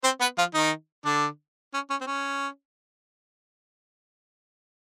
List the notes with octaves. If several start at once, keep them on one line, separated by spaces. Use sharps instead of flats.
C4 C5
B3 B4
F3 F4
D#3 D#4
D3 D4
C#4
C#4
C4
C#4